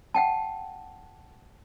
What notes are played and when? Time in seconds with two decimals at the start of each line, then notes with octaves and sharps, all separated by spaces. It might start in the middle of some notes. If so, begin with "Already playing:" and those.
0.14 F#5 G5 A5